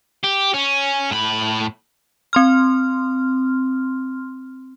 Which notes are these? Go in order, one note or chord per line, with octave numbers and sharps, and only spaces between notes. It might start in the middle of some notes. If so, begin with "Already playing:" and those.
G4
C#4
A2 B5
C4 C6 F6